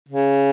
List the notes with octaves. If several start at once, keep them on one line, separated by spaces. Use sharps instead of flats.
C#3